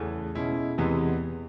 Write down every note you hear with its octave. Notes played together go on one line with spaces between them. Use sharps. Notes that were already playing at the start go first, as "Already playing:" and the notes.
Already playing: E2 C#3 E3 A3 C#4
B2 G#3 C#4 E4
E2 C3 E3 G#3 B3